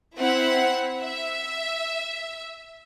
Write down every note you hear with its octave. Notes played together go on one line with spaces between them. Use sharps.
C4 E4 F#5
E5